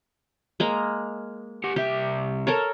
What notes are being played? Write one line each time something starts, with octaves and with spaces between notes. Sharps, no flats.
G#3 A#3 A#5
G4 F#5
C2 G4 E5
A4 A#4 C#5